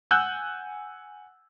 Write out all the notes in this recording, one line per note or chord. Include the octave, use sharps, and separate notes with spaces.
F#5 G#5 E6 F#6 G6